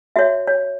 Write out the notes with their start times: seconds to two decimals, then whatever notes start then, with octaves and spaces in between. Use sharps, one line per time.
0.16 F#4 C#5 E5
0.47 C#5